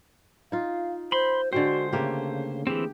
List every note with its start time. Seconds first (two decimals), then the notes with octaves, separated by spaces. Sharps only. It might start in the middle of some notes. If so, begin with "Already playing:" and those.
0.52 D#4 F4 F5
1.12 C5 B5 C6
1.53 D3 G#3 F#4 C5 G5
1.92 C#3 A3 A#3 G4
2.67 E3 C4 G4 G#4